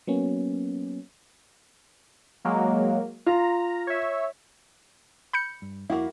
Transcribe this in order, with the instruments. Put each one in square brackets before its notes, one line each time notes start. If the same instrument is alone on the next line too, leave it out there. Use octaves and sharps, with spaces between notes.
[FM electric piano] F#3 A#3 B3 C#4
[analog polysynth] F#3 G#3 A#3
[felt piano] F4 [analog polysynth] A#5
[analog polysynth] C#5 E5
[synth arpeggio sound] B5 G6 C#7
[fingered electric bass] G2
[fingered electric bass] F2 [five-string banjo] A#3 F#4 F5 [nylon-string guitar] E4